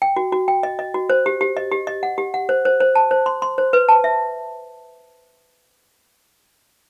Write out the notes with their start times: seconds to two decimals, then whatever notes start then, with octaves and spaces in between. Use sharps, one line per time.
0.02 G5
0.17 F#4
0.32 F#4
0.48 G5
0.63 D#5
0.79 D#5
0.94 F#4
1.10 C5
1.26 G4
1.41 G4
1.57 D#5
1.72 G4
1.87 D#5
2.03 F#5
2.18 G4
2.34 F#5
2.49 C5
2.65 C5
2.80 C5
2.95 A5
3.11 C5
3.26 C6
3.42 C6
3.58 C5
3.73 B4
3.89 A5
4.04 E5